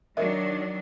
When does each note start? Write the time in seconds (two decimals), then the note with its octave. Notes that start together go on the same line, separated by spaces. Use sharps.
0.17 D#3 F#3 D4 A#4 D#5 E5